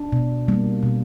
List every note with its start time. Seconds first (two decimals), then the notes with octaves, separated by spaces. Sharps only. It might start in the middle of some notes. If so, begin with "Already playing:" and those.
Already playing: D4
0.12 B2
0.48 G3 A#3
0.83 B2